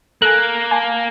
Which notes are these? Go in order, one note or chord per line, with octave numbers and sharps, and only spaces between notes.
A#3 A4 G#5 F#6
G#5 A5